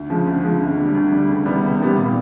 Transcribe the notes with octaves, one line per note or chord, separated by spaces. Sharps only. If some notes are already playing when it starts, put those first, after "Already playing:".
Already playing: D2
C#3 F3 G#3
D2
C#3 F3 G#3
D2
D3 G3
D2
D3 G3
C#2
C3 D#3 G3 B3
C#2
C3 D#3 G3 B3
A#2